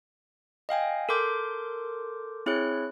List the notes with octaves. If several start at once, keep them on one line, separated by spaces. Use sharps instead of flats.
D#5 F5 G5 G#5
A4 A#4 C6 D6 G6
C4 E4 G#4 C#5 F#6